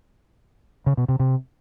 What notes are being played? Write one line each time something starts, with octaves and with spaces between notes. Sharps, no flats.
C#3
B2
C3
C3